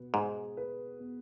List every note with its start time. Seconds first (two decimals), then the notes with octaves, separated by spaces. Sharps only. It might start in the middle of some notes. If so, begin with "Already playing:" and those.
Already playing: B2 B3
0.13 G#2 G#4
0.57 B4
1.00 B3